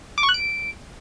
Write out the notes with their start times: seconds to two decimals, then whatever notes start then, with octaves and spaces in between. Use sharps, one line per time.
0.18 D6
0.23 C#6
0.29 F#6
0.34 D7